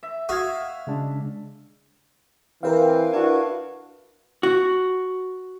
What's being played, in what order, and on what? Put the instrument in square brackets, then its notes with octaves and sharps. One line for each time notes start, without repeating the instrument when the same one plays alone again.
[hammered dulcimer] E5
[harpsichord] F#4 [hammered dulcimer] E5 F5 [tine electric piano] D#6 G#6
[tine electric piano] C#3 G#3 D4
[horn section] E3 C4 [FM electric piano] A#4 B4 F5
[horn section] D4 E4 F#4
[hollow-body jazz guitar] F#4